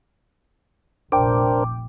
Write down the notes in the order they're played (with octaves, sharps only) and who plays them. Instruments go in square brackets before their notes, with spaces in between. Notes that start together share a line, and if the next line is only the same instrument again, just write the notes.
[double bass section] F1 A#1 A#2 [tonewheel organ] D4 A#4 C5 [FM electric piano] G5 D6